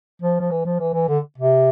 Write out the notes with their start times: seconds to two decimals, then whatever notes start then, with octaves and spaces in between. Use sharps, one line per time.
0.22 F3
0.40 F3
0.51 E3
0.65 F3
0.80 E3
0.94 E3
1.08 D3
1.38 C3